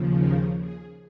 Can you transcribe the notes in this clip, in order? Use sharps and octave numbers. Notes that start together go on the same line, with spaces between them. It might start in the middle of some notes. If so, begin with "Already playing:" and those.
Already playing: D#2 C#3 F3
A#4
G#4